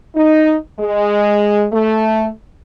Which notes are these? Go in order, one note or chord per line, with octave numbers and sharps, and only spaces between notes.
D#4
G#3
A3